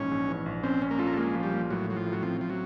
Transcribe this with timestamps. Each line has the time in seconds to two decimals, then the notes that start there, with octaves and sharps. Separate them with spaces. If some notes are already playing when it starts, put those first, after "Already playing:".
Already playing: A#1 G#2 E3 C#4
0.11 A#1
0.29 E3
0.46 A#1
0.64 C4 C#4
0.82 C#4
0.91 A#3
0.98 A3 F4
1.07 A#3
1.13 A3
1.17 G#3 A#3
1.35 F3
1.43 G3
1.53 A#3
1.71 A2 F#3
1.88 A2 F#3
1.96 F3
2.06 A2
2.12 F#3
2.23 F3 C4
2.41 A2 F3
2.50 F#3